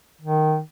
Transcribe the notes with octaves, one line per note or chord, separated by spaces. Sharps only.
D#3